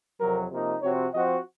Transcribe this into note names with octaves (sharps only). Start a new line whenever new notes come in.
F2 C3 F#3 A#4
C3 F3 A#3 D#4
C3 F3 C4 F#4 C#5
F3 C4 F#4 C5 D#5